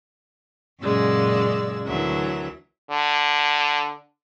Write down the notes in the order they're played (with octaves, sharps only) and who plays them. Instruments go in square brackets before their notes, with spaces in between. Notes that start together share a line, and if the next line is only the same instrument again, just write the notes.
[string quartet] F#2 A#2 C#3 G#3 D5 E6
D2 E3 F#3 A#4 E5
[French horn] D3